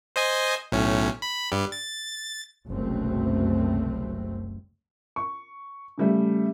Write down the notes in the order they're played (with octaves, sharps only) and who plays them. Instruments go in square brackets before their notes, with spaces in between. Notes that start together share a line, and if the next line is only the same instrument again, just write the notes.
[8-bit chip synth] C5 D#5 G#5
B1 A2 C#4
B5
G2 G3
A6
[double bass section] F#1 C2 F#2 B2 A3 C4
[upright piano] C#6
C#3 G3 A3